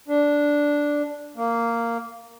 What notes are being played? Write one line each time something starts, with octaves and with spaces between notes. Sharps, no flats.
D4
A#3